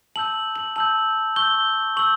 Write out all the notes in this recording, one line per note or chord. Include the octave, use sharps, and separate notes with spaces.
A5 E6 G6 F#7
F#7
A5 E6 G6 F#7
C#6 E6 G6 G7
C#6 E6 G6 F#7